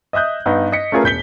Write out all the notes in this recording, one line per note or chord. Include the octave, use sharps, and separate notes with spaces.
D#5 E5 D#6 F#6 G6
G2 B3 D#4
D#5 B6 C#7
A3 C#4 F4 G#4 A#4 B4
E1 G6 B6 G7